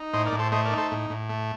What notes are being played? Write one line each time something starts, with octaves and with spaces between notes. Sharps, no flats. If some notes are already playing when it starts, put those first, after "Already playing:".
Already playing: D#4
A2 C5 D#5
A#4 D5
A2
A4 C5
A3 C5 D#5
A#4 D5
D#4
A4 C5
A2
A2
A3